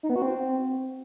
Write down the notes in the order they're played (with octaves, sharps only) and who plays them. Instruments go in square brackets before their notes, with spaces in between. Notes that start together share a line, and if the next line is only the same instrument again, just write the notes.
[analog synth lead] D#4
B3
F#4
C4